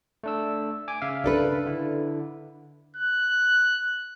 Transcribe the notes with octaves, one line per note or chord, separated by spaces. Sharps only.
A3 D4 E6
G#5 D6
C#3 E5 F5
D4 A4 B4
D3 E4
F#6